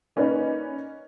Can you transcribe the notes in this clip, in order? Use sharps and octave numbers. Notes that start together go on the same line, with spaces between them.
A#3 C#4 D#4 B4 D5